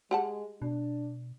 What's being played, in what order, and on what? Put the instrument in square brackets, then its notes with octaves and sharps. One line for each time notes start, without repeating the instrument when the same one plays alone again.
[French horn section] G#3 [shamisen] G4 F#5 A5
[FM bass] B2 [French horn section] D4